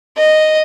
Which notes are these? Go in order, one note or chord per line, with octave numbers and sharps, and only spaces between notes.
D#5